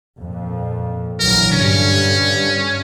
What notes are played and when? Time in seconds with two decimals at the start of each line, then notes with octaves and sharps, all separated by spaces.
0.20 F2 A#2
1.20 A#1 E3 F#3 A#4
1.52 G2 D3 C#4